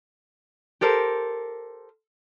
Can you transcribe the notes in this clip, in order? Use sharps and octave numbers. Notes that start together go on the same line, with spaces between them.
G4 A4 A#4 C5